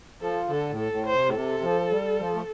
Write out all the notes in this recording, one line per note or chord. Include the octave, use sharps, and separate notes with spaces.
F3 A4
D3 A4
A2
A4
A2
C5
C3
A2
C3 A4
F3
G3
F3
A3